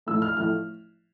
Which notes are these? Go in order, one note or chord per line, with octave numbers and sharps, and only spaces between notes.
A1 A2 F3 A3 E6
F6
A1 A2 F3 A3 F6